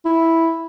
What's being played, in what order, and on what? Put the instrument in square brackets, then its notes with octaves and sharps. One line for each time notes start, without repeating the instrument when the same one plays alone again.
[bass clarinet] E4